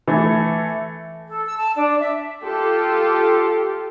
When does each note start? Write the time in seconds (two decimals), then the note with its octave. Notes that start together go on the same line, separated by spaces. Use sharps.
0.07 E3 A3
1.28 A4
1.46 E6
1.58 A5
1.77 D4
1.99 E5
2.41 F4 G4 A4